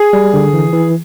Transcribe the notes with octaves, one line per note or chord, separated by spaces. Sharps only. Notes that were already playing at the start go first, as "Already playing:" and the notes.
Already playing: G#4
G3
D3
E3
E3